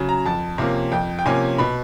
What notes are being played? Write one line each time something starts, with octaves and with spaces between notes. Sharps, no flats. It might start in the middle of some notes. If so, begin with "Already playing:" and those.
Already playing: C#3 F#3
A#5
F2 A5
C3 F3 A#3 C#4
F2 G5
G5
C3 F3 A#3 C#4 G#5
B2 B5